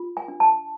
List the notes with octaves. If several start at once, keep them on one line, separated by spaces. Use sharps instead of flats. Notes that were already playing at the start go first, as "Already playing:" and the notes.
Already playing: F4
G#5
D4
A5